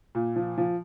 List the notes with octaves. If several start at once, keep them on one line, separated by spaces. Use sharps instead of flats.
A#2
F3
F3